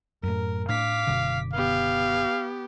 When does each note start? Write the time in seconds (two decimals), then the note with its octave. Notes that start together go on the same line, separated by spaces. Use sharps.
0.23 F#2 A2 A#4
0.69 A2 D4 F5 D6 B6
1.07 F#1 B2 D3
1.54 B3 G4 F5